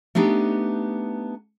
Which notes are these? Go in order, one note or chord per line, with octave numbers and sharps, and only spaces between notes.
A3 B3 D4 D#4 G4